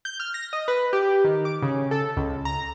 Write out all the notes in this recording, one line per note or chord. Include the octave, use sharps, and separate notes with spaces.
G6
F6
A#6
D#5
B4
G4
D#3
D6
C#3
A4
C#2
A#5